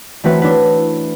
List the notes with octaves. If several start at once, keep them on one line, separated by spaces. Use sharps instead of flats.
E3 A3 C4 F#4 B4 E5
D4 E4 B4